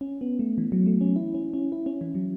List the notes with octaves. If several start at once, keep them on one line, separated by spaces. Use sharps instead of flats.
C#4
B3
A3
E3
F#3
A3
C#4
E4
C#4
C#4
E4
C#4
E3
F#3